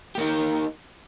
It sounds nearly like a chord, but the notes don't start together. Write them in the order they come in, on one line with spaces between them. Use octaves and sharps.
G4 A#3 D#4